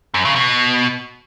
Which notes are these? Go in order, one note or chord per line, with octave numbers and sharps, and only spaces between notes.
F#2
C#3
B2